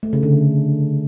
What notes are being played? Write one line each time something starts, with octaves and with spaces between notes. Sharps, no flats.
A3
C#3
D3